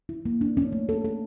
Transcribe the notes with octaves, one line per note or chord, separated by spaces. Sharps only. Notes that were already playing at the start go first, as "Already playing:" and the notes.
E4
A#3
D4
C#4
A3
A4
A4